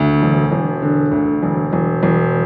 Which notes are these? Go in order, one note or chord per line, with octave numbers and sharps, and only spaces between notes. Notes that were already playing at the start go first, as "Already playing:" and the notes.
Already playing: D2
E1
E1
D3
D2
E1
E1
E1